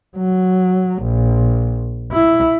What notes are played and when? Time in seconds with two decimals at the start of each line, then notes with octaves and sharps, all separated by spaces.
0.17 F#3
1.03 A#1
2.12 E4